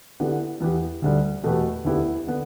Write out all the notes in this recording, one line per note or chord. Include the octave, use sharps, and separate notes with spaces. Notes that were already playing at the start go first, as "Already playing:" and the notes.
D3 B3 E4 G4
E2 E3 B3 E4 G4
D2 D3 G3
E2 B2 A3 G4 B4
D2 D3 B3 E4 G4
D3 B3